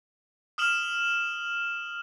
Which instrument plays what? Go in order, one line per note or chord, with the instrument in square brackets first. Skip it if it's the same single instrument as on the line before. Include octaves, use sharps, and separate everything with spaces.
[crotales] D#6 F6 E7 F#7